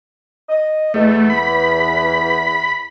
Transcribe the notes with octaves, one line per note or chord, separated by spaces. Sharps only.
D#5
E2 A3
B5